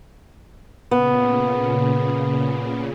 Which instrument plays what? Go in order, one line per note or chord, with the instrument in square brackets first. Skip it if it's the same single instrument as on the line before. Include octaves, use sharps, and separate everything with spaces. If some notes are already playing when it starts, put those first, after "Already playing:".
[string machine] A#2 C#3 [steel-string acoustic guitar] B3